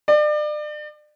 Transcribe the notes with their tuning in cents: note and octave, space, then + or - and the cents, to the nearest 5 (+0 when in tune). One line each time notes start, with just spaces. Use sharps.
D5 +35